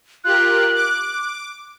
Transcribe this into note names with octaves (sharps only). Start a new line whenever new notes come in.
F4 G4 A#4 F#6
D6